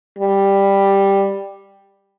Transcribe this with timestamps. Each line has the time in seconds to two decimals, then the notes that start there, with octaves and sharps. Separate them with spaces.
0.19 G3